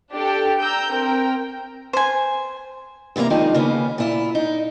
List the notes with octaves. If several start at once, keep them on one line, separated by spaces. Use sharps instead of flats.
D4 G4 A4 G5
G5 A#5 E6 G6
C4 A#4 G5
C5 G#5
E2 C3 E3 A#3 A#5
D#3 F3 G#3 D4 D#4
C#3 A#3 B3 C#4
A#2 E4 F4
D#4